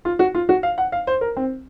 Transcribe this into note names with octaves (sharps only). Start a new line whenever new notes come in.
F4
F#4
F4
F#4
F5
F#5
F5
C5
A#4
C4